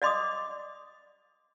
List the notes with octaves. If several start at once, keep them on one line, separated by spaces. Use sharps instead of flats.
D5 D#5 C6 D6 D#6